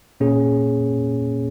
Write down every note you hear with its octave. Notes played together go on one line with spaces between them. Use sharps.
A#2 A#3 C#4 G#4